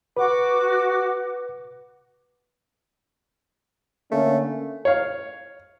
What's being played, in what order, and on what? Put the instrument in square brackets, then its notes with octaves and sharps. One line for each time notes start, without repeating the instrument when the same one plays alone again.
[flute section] F#4 D6 [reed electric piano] B4
[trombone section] D3 A#3 C#4 [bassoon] A3
[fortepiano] C#5 F5